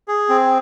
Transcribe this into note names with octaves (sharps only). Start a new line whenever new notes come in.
G#4
C4